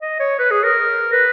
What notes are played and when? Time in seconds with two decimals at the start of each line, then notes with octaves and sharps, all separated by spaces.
0.01 D#5
0.20 C#5
0.39 B4
0.51 G#4
0.63 A#4
1.12 B4